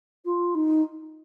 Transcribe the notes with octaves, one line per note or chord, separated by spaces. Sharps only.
F4
D#4